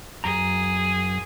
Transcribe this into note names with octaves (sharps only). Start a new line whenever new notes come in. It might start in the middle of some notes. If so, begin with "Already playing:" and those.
F#2 G#4 A#5